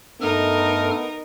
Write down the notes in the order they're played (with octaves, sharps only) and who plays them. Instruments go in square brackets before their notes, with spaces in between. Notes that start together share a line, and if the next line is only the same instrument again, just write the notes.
[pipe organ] G2 A4 F6 [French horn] A3 [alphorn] B3 [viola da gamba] D#4 A#4